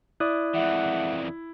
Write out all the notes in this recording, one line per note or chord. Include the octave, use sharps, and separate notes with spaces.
E4 D5 D#6 F#6
F2 E3 G#3 E5 F#5